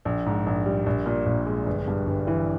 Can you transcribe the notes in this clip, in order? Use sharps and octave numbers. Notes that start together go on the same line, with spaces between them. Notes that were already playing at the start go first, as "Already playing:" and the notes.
A#1
G#2
A#1
G3
A#1
A#2
A#1
G#3
G1
G2
G1
E3